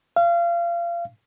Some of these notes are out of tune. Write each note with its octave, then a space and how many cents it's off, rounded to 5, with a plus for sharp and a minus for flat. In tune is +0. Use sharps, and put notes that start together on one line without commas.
F5 -30